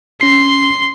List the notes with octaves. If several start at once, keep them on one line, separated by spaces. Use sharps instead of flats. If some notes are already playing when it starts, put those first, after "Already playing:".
C#4 C6 C7